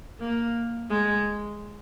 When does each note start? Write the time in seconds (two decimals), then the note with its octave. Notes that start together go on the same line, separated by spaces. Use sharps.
0.20 A#3
0.90 G#3